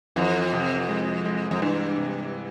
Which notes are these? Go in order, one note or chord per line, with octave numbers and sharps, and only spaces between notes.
F2 E3
C3
G#3
G#3
F2
G2 E3
C3